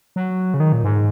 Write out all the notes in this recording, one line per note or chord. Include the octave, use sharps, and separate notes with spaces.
F#3
C#3
D#3
A#2
G#2